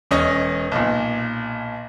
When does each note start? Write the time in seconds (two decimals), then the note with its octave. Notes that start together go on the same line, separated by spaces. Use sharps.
0.11 E1 C#4 D#5 C#6 A#6
0.72 B1 A#2